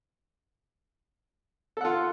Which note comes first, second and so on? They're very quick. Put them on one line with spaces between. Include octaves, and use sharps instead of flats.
A4 F#5 F4